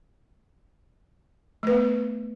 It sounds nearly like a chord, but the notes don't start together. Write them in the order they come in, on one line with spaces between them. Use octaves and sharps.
A3 B4 B3